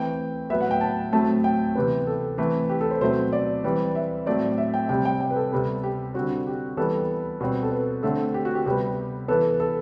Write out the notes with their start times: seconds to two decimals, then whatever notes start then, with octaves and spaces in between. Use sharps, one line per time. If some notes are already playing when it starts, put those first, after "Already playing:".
Already playing: E3 A3 C4 G5
0.50 A2 F#3 B3 E5
0.61 F#5
0.71 G5
0.81 A5
1.13 A2 F#3 A3 C4 A5
1.44 G5
1.75 C3 E3 B3
2.07 A4
2.38 E3 A3 C4
2.69 G4
2.81 A4
2.91 C5
3.01 B2 F#3 A3 C4 C5
3.33 D5
3.64 E3 G3 C4
3.95 E5
4.26 A2 F#3 A3 C4 D5
4.58 E5
4.74 G5
4.89 C3 G3 C4 G5
5.05 G5
5.20 G5
5.31 B4
5.36 A4
5.52 C3 G3 B3
5.83 G4
6.14 D3 G3 C4 F#4
6.47 G4
6.77 E3 G3 B3 A4
7.41 B2 G3 C4
7.63 A4
7.72 B4
8.03 D3 A3 C4 A4
8.34 G4
8.45 F#4
8.55 G4
8.66 C3 G3 B3 G4
9.28 E3 B3 A4
9.60 A4